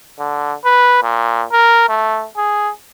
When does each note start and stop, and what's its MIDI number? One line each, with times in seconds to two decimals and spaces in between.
0.19 0.54 50
0.65 1.00 71
1.03 1.44 46
1.52 1.86 70
1.89 2.25 57
2.37 2.70 68